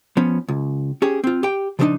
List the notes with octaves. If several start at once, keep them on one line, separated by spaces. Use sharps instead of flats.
F3 B3 C#4
C#2
C#4 G4 G#4
C4 F4
G4 G5
C#3 F3 G3 A3 D4 D#4